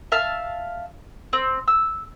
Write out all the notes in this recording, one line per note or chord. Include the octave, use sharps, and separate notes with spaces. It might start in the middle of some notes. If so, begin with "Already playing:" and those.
E5 F5 A5 F6
C4
E6